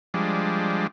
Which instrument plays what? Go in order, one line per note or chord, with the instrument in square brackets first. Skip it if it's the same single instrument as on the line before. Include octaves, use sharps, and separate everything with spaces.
[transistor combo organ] F3 G3 G#3 D4